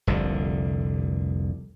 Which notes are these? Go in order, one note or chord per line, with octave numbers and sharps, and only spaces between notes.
F1 C2 D3